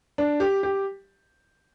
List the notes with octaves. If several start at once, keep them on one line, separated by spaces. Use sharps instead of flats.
D4
G4
G4